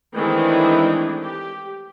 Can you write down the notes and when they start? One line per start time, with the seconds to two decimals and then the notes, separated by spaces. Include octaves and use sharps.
0.15 D#3 E3 G#3 A3 C4 D4
1.20 G4